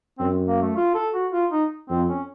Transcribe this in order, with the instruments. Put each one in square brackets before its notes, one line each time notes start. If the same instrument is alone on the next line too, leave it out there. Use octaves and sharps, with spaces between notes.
[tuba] F#2 [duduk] C4
[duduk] A#3
A3
F4
A4
F#4
F4
D#4
[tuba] F2 [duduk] C4
[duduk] C#4